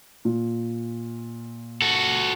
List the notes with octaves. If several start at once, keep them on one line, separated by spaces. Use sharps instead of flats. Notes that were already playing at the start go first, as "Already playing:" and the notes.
A#2
F#4 A4